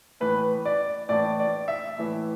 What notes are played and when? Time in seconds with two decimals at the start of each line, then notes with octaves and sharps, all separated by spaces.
0.20 A2 E3 B4
0.65 D5
1.09 A2 E3 D5
1.40 D5
1.68 E5
1.98 A2 E3